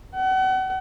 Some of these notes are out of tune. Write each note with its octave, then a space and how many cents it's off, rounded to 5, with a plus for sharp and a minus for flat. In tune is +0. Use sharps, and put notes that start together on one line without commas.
F#5 +35